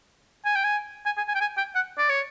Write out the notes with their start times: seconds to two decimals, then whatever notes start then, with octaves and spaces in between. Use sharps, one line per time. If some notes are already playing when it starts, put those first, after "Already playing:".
0.45 G#5
0.55 G5
0.64 G#5
1.06 G#5
1.17 G#5
1.28 G#5
1.35 G5
1.41 G#5
1.57 G5
1.75 F#5
1.98 D5
2.09 C#5